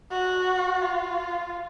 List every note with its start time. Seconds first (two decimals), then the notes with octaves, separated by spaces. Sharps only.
0.11 F#4
0.81 F4